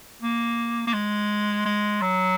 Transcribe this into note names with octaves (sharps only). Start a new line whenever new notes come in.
A#3
A#3
G#3
G#3
F#3